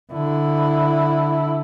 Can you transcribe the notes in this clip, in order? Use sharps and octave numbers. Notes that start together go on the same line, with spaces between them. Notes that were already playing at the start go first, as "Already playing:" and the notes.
D3 E4